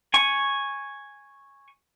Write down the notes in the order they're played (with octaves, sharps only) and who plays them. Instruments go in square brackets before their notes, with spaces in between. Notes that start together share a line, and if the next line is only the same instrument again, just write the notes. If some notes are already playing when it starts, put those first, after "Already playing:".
[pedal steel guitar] G#5 C#6